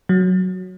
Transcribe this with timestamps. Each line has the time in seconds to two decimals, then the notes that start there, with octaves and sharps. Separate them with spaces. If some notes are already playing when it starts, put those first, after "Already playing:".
0.09 F#3